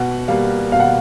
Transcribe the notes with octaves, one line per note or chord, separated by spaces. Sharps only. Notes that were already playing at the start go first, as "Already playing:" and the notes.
Already playing: B2 F#5
G3 A#3 F5
B2 F5
F#5